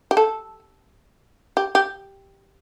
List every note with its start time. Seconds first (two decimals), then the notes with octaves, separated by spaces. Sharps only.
0.11 G4
0.17 A4
1.57 G4
1.75 G4